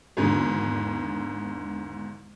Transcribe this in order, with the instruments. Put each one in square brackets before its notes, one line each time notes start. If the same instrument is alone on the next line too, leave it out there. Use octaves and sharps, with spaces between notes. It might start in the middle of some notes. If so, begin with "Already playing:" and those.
[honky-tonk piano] G#1 E2 G#2 D3